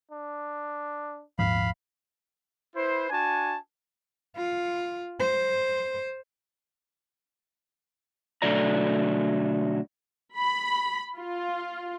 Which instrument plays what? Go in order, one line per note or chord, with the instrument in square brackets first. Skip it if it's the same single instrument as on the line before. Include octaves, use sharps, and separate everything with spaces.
[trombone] D4
[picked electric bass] D#1 G#2 F3 [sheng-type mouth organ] F5 B5
[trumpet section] E4 B4 C5
D4 F#4 G#5 A5
[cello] F4
C5
[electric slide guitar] B2 D3 F#3 A3 D5 A#5
[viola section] B5
F4